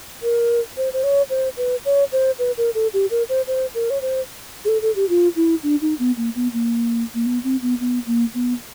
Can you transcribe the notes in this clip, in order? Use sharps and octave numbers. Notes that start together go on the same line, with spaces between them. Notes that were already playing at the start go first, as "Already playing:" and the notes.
A#4
C5
C5
C#5
C5
B4
C#5
C5
B4
A#4
A4
G4
A#4
C5
C5
A#4
C#5
C5
G#4
A4
A4
G4
F4
E4
D4
D#4
B3
A#3
B3
A#3
A#3
B3
C4
B3
B3
A#3
B3